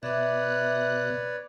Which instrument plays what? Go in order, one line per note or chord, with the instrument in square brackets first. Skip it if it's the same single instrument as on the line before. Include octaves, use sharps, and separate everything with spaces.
[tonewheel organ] B2 F#6 [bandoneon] B4 C#5 D5 [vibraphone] E5 D6